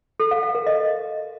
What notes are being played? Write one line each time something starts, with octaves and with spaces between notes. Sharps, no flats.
A4
F5
F5
A#4
D#5